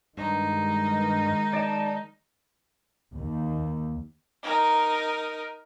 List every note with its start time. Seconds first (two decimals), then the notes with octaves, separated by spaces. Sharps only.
0.18 G2 D#3 G#3 D#4
1.53 D5 A5
3.15 D#2
4.43 D#4 A#4